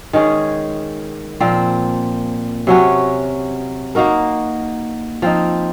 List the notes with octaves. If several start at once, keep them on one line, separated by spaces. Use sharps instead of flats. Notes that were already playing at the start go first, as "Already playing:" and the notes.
D#3 G#3 C#4 G#4
A#2 F3 C4
C3 F#3 C#4 F#4
A#3 D#4 F#4 A#4
F3 C4 D#4